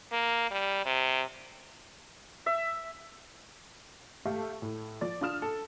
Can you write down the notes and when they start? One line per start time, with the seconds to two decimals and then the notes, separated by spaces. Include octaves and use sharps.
0.12 A#3
0.51 G3
0.85 C3
2.46 E5
4.25 A3 G4 A4 E5 F5
4.62 A2
5.01 F3 D5 A6
5.21 D4 F4 D#6 F6 E7
5.42 A4